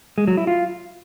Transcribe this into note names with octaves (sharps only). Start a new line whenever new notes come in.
G#3
F#3
E4
F4